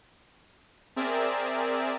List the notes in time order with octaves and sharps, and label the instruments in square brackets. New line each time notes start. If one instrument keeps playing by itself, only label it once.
[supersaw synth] C4 G#4 A#4 D5 E5